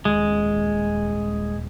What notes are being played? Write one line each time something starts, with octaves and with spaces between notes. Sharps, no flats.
D#1 G#3